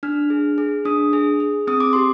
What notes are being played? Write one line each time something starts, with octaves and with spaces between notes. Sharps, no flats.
D4 F6
G#4
G#4
D4 D#6
G#4
G#4
C4 D#6
D6
G4 C6